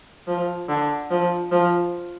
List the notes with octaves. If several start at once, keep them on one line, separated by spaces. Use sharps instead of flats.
F3
D3
F3
F3